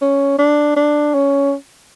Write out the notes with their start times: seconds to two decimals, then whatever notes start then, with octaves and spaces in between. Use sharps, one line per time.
0.01 C#4
0.38 D4
0.76 D4
1.14 C#4